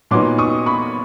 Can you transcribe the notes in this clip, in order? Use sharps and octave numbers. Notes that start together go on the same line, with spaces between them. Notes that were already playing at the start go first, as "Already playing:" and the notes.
A#2 F#3 B3 D#4 C6 D6
C#6 D#6
B5 C#6